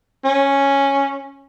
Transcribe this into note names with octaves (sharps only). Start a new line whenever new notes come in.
C#4